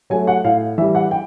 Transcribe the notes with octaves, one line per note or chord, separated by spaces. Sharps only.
F#3 A3 G#5
F#5
A2 F5
E3 G3 E5
F#5
G5